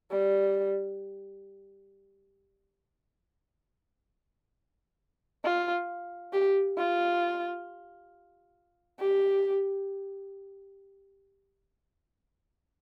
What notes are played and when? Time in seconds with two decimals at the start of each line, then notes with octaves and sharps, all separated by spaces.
0.12 G3
5.44 F4
6.33 G4
6.78 F4
9.00 G4